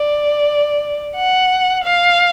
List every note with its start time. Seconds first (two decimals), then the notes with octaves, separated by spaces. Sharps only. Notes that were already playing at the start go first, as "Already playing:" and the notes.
Already playing: D5
1.16 F#5
1.84 F5